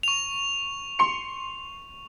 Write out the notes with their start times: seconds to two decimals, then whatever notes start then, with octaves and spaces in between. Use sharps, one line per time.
0.03 C#6 F7
0.99 C6 C#7